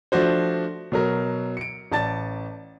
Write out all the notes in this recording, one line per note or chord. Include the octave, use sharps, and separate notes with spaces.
F3 A3 D4 F#4 C5
B2 F#3 A#4
C#7 D7
A1 D5 A5 A6